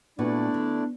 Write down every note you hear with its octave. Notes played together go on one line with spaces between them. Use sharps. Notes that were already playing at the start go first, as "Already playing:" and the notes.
A#2 A3 B3 D4 E4 F#4 B4 D5
D3